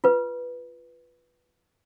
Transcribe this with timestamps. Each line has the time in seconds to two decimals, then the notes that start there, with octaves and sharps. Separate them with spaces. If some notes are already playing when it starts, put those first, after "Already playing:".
0.04 F4 B4